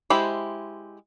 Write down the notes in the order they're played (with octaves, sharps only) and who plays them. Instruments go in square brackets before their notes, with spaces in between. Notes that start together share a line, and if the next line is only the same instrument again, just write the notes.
[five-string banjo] G#3 E4 G4 C5 B5